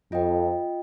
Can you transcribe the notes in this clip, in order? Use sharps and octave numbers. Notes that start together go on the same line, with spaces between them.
F2 F4 D#5 G5